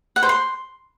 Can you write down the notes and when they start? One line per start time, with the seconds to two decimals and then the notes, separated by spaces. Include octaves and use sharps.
0.16 F#5
0.23 C5
0.29 C6